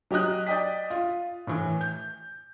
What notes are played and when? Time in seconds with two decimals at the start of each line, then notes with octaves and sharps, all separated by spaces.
0.11 F#3 G4 D#5 D#6 F#6
0.47 D5 D#5 G5 D#6 B6
0.90 F4
1.47 A2 E3
1.81 G6